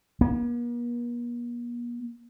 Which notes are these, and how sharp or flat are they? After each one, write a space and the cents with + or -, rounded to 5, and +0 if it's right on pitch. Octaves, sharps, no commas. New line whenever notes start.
A#3 +45